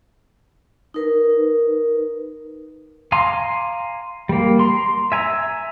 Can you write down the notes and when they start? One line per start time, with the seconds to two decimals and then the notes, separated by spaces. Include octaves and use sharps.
0.94 D#4 A#4 B4
3.12 F5 G#5 A#5 C6 D6
4.29 G3 A#3
4.59 A#5 C6
5.12 E5 G#5 A#5